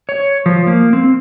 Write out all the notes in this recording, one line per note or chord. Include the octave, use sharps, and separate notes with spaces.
C#5
F3
A#3
C4